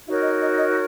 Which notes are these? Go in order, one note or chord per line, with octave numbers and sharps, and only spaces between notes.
D#4 F#4 A#4 C#5 E5
D#5
D#5
D#5